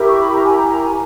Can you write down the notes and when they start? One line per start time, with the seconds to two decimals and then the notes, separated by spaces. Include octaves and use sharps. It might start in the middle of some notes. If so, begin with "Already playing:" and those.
Already playing: E4 G4 A#4
0.08 C#6
0.21 B5
0.32 A#5
0.44 G#5
0.56 A#5
0.68 A#5
0.80 G#5